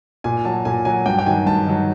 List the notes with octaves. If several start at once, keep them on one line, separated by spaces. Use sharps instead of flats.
A#2 G#5
F#3 A5
A#2 G#5
F#3 G#5
G2 G5
G5
D#3 F#3 G#5
G2 A5
D#3 F#3